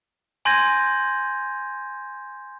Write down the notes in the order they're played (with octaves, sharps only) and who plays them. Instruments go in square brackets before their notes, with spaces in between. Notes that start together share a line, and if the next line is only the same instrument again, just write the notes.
[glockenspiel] G#5 C6 G6 G#6 A#6 D#7